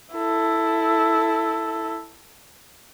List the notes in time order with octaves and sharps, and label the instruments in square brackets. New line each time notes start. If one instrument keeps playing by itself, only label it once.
[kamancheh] E4 A4